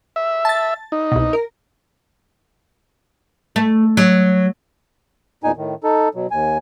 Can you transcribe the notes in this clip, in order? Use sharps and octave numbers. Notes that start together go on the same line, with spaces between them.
E5
A5 A6
D#4
C2 B2
A#4
A3
F#3
E2 A#2 D#4 G#5
A2 D#3
D#4 A4
B2 F#3
D#2 G#5